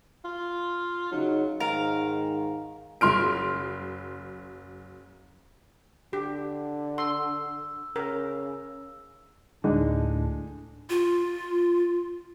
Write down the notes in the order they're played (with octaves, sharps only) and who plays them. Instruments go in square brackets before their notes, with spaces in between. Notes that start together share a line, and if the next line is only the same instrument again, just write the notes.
[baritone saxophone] F4
[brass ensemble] C#3 D#4 [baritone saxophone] F#3
[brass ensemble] G#2 [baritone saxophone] D#3 [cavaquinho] A#4 F5 A#5
[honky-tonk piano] F#1 C6 F6 D7
[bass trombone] D3 [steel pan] G4
[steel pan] C6 [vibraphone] E6
[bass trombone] C#3 [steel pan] A#4
[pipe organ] D2 A2 D4 [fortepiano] D3 G#3 D#4
[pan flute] F4